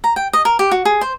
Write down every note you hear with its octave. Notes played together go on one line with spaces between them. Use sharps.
A#5
G5
D#5
A#4
G4
F#4
G#4
C5